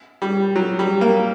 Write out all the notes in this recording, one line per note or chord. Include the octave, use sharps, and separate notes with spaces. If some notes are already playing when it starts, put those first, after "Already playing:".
G3
F#3
G3
A#3